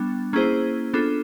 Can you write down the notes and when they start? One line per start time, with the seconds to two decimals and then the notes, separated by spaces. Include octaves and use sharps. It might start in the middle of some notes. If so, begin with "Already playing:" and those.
Already playing: G3 B3 D4
0.33 A#3 C#4 E4 G#4 C5
0.94 B3 D4 F4 A4